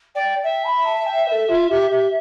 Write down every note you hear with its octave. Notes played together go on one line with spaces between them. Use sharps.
D5 G5
E5 G5
B5
A5
G5
B4
A4
F4
G4
G4